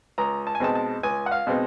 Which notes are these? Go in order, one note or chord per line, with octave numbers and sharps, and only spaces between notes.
C#2 A#5
A5
G#5
B2 G#3 C4 D#4 A5
A5
C#2 G#5
F#5
F5
B2 G#3 C4 D#4